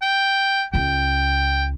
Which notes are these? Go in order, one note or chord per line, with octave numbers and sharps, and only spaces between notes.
G5
C#2 C#3 G5